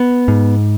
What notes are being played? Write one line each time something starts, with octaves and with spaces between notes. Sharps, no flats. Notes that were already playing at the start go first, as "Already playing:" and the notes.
Already playing: B3
G#2